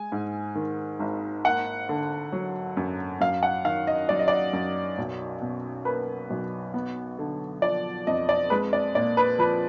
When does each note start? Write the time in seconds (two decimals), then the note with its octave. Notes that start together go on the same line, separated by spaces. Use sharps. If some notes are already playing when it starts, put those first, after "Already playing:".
Already playing: G#3 G#5
0.12 G#2
0.55 D#3
1.00 G#1
1.44 A#3 F#5
1.89 D3
2.33 F#3
2.77 F#2
3.20 F#2 F5
3.43 F#5
3.65 D#3 F5
3.87 D#5
4.09 F#3 D5
4.19 D#5
4.28 D5
4.53 F#2
4.98 B1
5.41 B2
5.85 A#3 B4
6.30 B1
6.74 B3
7.18 D3
7.62 F3 D5
8.07 F2 D#5
8.29 D5
8.50 G#3 B4
8.73 D5
8.95 A#2 D5
9.17 B4
9.38 F3 B4